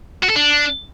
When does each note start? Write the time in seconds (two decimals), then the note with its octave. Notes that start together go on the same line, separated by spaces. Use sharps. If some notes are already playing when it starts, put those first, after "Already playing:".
0.23 F#4
0.30 A4
0.36 D4